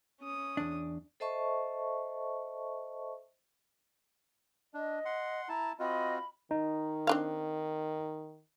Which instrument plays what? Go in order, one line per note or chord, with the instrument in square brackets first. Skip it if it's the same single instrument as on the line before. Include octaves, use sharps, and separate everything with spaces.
[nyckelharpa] C#4 D#6
[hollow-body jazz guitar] E2 D4
[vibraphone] A4 C5 D#5 E5 A5 C#6
[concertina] D4 [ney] D#5
[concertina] F#5 C6
[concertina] E4 A5 [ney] A#5
[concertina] C4 F4 F#4 [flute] D#5 [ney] B5
[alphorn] D#3 [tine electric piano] D#4
[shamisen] C4 D4 F5